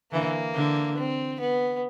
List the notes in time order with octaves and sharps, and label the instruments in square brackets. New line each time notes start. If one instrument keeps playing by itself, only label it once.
[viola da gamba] D3 E3 [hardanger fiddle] A#3
[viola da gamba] D3
[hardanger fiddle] C4
B3